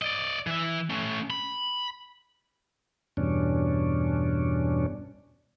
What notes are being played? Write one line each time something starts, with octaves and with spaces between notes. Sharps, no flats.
D5 D#5
E3 E5
A3 C#4
B5
E2 G2 B2 C#4 D4